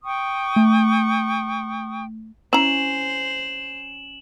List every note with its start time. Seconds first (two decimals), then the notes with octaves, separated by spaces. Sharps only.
0.04 G5 C#6 D#6
0.56 A3
2.53 C#4 E4 C5 A#5 E7 F#7